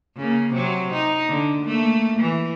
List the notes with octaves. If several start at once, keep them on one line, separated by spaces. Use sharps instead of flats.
C#3 A#3
C3 F#3
D#4
D3
A3 A#3
E3